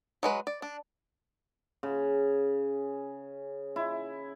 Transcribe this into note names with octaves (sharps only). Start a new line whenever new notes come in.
F#3 G#3 B4
D5
D4
C#3
E4